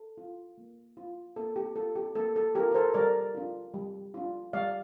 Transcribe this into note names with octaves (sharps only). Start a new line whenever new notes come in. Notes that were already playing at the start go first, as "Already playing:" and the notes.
Already playing: A4
F4
A#3
F4
A#3 A4
G4
F4 A4
G4
A#3 A4
A4
F4 G4 A#4
A#4
A4 C5
G3 A#4 D5
D4 F4
G3
D4 F4
G3 D5 F5